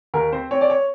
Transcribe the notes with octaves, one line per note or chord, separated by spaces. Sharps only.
D#2 A#4
C4 C5
C4 C#5
D5
C#5